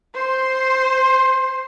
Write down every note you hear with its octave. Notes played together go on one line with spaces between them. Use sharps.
C5 C6